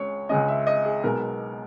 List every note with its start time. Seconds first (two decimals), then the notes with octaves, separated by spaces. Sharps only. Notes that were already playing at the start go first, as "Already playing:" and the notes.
Already playing: C#2 C#3 G#3 C#5
0.29 C#2 C#3 G#3 C#4 D#5
0.48 E5
0.67 D#5
0.85 G#4
1.03 B1 B2 G#3 B3 A#4